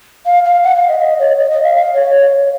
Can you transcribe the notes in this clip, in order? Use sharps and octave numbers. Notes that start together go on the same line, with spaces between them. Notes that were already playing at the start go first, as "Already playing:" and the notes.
F5
F5
F#5
F5
D#5
D#5
C#5
D#5
D#5
F5
F5
C#5